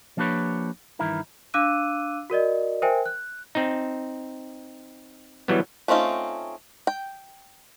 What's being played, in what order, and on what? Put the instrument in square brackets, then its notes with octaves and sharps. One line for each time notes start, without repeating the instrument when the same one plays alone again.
[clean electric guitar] F3 A#3 D4 G4 B4 C#5
G2 D#3 E3 E4 A#4
[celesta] D4 F5 D6 E6 F#6 D#7
F#4 A#4 D5 D#5
A#4 C5 E5 G5 G#5
F#6
[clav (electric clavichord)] C4 D#4
E3 F#3 G3 B3
[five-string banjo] A3 C4 C#4 D#4 F4
G5